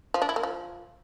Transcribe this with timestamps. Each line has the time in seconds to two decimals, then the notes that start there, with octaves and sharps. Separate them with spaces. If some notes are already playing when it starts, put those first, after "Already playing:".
0.14 F3
0.22 D4
0.29 E4
0.36 A#3
0.43 F3